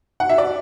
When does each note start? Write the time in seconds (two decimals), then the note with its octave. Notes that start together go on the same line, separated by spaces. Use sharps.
0.20 F#5
0.29 E5
0.38 D5